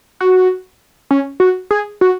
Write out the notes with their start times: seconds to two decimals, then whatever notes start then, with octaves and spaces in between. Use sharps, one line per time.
0.20 F#4
1.11 C#4
1.40 F#4
1.71 G#4
2.01 F#4